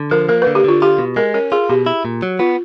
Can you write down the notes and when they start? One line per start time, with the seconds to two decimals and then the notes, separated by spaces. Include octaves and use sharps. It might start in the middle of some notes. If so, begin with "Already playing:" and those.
Already playing: D3
0.11 F3 A#4
0.29 A#3 A#4
0.42 B4
0.47 D3
0.55 G4
0.64 D3 F4
0.82 F4 G4
0.99 B2
1.16 G#3 A#4
1.34 C#4 A#4
1.52 F4 G#4
1.69 B2 G4
1.86 E4
2.05 A#2
2.22 F#3
2.39 B3 F4